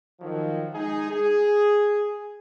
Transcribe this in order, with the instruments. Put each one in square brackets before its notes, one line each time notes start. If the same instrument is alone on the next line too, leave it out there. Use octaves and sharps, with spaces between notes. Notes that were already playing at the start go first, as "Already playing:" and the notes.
[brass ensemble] D#3 F3 F#3
G#3 D#4 G#4
G#4